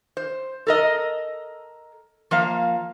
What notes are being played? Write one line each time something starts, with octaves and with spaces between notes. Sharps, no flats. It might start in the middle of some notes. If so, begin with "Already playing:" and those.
C5
A4 A#4 D#5
F3 A#3 F5